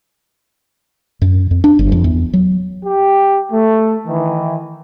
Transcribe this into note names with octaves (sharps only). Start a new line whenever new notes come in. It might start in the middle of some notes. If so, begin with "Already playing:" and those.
F#2
F2
D4
G1
F2
E2
F#3
G4
A3
D#3 E3